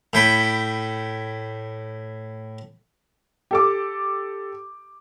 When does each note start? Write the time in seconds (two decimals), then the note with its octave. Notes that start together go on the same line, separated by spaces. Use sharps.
0.13 A2 G5 B5
3.51 G4 A4 D6